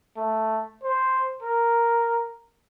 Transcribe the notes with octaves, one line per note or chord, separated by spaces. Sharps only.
A3
C5
A#4